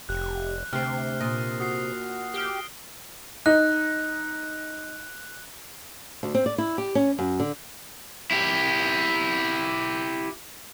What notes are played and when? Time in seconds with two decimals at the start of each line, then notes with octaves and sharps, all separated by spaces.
0.09 F1 G4 F#6
0.73 D2 C3 C4 G4 F6 C7
1.21 A#2 D#6 A#6
1.60 F#4 D#6 C7
2.34 G4 F6 D7 G7
3.46 D#4 F#6
6.23 D2
6.35 C4
6.46 D5
6.58 E4
6.78 G4
6.95 C#4
7.19 F#2
7.40 D3
8.31 E4 G4